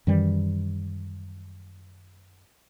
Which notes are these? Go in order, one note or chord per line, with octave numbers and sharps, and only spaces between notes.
F#2 D#3 E3 G3